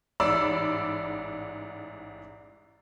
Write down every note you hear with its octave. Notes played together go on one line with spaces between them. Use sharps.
A1 G#2 D5 B5 E6